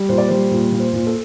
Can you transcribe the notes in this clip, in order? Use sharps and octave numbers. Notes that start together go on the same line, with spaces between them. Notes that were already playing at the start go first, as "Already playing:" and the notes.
Already playing: G3
A#2 C5
D5
G3 C5
A#2
A#2
C5
A#2
A4